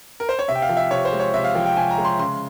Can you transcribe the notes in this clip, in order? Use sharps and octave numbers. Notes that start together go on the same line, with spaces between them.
A#4
C5
C#5
C3 E5
G5
F5
F3
E5
C3 C#5
C5
G#3
C#5
C3 E5
F5
F3 G5
G5
C3 G#5
A#5
G#3
C6
C#3 C6